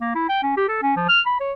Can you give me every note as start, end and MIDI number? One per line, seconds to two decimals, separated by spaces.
0.01 0.12 58
0.15 0.25 64
0.29 0.40 79
0.43 0.53 61
0.57 0.67 67
0.68 0.79 69
0.82 0.92 61
0.96 1.05 53
1.09 1.21 89
1.26 1.39 83
1.40 1.53 73